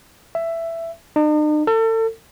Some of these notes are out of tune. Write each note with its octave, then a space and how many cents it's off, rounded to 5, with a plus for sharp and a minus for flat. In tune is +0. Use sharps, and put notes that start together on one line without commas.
E5 +10
D#4 -45
A4 +35